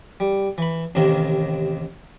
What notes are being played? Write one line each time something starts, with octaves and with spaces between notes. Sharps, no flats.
G3
E3 B5
A1 D#2 C3 D#3 A#3 A#4